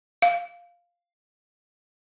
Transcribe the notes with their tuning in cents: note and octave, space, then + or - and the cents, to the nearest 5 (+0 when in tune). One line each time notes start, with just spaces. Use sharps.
F5 +0